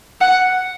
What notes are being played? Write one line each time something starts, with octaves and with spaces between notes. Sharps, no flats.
F#5